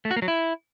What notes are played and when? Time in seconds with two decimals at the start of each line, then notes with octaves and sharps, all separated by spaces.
0.05 A3
0.11 F#4
0.16 A#3
0.22 F#3
0.28 E4